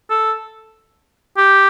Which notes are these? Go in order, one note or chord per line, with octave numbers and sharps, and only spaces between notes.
A4
G4